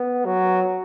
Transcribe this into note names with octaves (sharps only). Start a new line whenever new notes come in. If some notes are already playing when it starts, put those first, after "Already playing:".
Already playing: B3
F#3